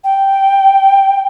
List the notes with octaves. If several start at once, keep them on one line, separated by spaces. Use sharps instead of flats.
G5